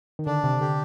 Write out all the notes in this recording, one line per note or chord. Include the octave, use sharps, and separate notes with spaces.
D#3
D3 D4
C3
D3 G4